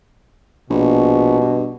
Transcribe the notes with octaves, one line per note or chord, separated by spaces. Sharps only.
A#1 B2
G2